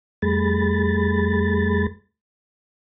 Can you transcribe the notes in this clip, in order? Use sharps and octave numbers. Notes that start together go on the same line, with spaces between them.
F2 G3 A3 G#4 B5 A6